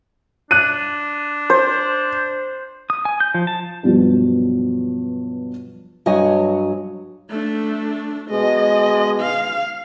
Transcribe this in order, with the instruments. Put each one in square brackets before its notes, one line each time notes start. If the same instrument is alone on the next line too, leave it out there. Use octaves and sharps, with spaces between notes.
[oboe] D4 [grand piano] F#6 D#7
[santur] C5
[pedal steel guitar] D#6
G#5
G6
F3
A5
[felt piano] G2 B2 F3 F#3
[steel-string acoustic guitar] G2 F#3 C#5 D#5 G#5
[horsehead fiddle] A3 D4
[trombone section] B2 G#3 [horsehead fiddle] D#5
[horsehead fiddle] F5